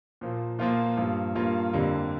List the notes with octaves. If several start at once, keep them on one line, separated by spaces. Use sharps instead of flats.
A#2 F3 A#3
A#2 F3 A#3 F4
G2 F3 A#3
G2 F3 A#3 F4
F2 D3 G3 A#3